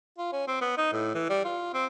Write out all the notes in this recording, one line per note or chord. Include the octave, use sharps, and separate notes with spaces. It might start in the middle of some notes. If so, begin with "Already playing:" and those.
F4
C#4
C4
B3
D#4
A2
E3
G3
F4
C4